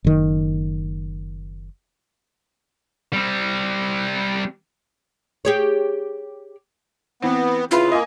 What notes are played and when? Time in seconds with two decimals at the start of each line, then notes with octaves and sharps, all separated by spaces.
0.04 F#1 D#3
3.13 G3 C4
5.45 G4 G#4 C#5
7.22 E3 B3 C4
7.71 C#3 E4 F4 B4
7.92 A#3 D#5 G#5